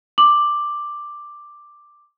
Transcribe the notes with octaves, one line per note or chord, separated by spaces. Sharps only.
D6 F#7